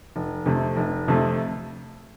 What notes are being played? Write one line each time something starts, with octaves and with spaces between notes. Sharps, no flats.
F1
F2 C3 A3
F1
F2 C3 A3